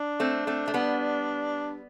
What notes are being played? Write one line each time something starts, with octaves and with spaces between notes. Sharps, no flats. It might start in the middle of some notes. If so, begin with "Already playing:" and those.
Already playing: D4
A3 C4
A3 C4
A3
G3 B3